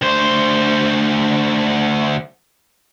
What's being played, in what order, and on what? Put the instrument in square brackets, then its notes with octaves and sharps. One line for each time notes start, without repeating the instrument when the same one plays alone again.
[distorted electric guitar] D2 C5